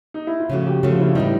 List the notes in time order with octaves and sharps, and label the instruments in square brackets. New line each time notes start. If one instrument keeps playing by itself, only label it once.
[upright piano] D#4
E4
F4
[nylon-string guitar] C#3 F3 A3 [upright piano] F#4
[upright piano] G4
[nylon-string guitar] C#3 F3 A3 [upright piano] F#4
[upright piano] F4
E4
D4
[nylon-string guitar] A2 E3 G3 [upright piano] D#4